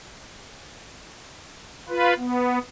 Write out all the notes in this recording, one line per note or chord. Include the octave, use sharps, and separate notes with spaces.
F4 B4
B3